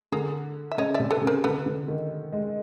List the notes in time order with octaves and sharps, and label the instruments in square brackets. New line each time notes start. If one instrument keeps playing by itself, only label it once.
[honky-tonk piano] D3 [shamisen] G#4 A#4
[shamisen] E5
[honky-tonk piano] C#3 [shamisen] C#5 D#5
[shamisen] D5 E5
[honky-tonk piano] C3
[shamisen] A4 B4
[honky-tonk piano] C#3
[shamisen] A#4 C5
[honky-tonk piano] D3 [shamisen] A4 B4
[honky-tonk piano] D3
D#3
G#3